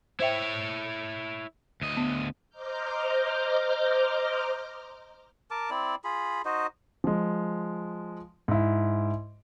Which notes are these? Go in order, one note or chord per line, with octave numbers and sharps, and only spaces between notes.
E4 C5 C#5 E5 G5
D2 D#5
B3
C5 D#5 A#5 D6 F6 G6
A#4 A5 D6
C4 E4 D5
F4 G#4 B5
D#4 F#4 C5 D#5
F3 G#3
G#2 E4